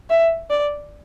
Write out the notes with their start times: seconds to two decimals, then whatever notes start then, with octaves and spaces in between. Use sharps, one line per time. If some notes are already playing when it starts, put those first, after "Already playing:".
0.10 E5
0.50 D5